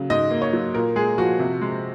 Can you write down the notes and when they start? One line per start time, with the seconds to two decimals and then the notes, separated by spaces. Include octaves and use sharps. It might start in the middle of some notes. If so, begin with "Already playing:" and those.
Already playing: C#3 F#3
0.10 G#2 D#5
0.31 A#3
0.42 C#5
0.53 F#3
0.74 A#2 A#4
0.96 G#3 G#4
1.18 F3 F#4
1.39 C3
1.61 G#3